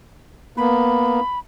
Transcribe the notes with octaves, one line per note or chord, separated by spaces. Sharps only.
A#3 B3 B5